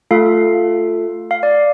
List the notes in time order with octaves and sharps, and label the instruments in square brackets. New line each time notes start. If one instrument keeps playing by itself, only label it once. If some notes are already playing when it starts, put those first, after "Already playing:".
[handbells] A3 F4 A4 F5
F5
D5